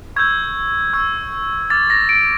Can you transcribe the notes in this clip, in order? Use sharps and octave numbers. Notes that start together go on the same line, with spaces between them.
C#6 E6 G6 G#6
C#6 E6 G6
D6 F6 A6
A#6
D7